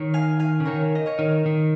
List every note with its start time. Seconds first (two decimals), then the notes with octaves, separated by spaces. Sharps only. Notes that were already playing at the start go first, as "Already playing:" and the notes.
Already playing: D#3 C#5
0.14 F5 G#5
0.39 F5 G#5
0.60 C#3
0.65 D#3 A#4 C#5
0.95 D#5
1.06 A#4 C#5
1.19 D#3
1.46 D#3